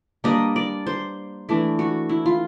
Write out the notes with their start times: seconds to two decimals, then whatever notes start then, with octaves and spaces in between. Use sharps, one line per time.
0.24 G3 A#3 D4 D#5
0.56 D5
0.87 C5
1.49 E3 A3 D4
1.79 F#4
2.09 E4
2.26 F4